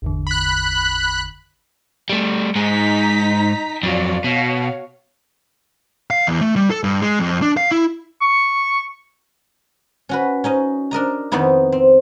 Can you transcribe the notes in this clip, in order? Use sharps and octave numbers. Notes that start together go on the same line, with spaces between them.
G#1 E2 D3
B5 F#6
G3 A3
G#2 G#3 D#4 A#5 B6
F2 F#3 F4 D5
B2 F#4 C#5 F5
F5
E2
A3
G3
A4
G2
G#3
F2
D4
F5
E4
C#6
C#4 F#4 B4
C#4 D#4 D#5
D4 A#4 D#5 A#5
F2 D#3 B3 D#4 E4
C4